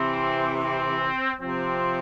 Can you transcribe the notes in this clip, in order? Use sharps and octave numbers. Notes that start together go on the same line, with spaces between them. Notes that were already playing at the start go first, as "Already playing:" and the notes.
Already playing: C3 E3 C4
C4
C3 F3 C4